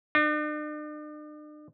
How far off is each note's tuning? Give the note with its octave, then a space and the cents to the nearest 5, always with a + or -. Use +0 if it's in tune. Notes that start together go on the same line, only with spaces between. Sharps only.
D4 +45